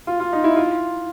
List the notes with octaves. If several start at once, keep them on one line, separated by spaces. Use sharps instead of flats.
F4
F4
D#4
E4
F4